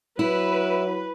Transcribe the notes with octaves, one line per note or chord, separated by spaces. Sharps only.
F#3 E4 B4